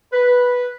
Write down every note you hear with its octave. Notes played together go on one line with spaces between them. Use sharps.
B4